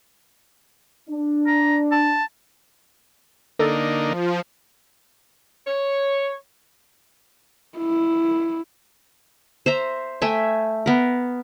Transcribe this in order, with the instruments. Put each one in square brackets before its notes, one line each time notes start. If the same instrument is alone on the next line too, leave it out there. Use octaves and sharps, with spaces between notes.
[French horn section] D4
[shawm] A#5
A5
[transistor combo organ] D3 A#3 D#4 [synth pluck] A4 D5
[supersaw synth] F3
[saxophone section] C#5
[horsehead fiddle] E4
[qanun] C5 E5 A#5
A3 E5 G5 G#5
B3 A#4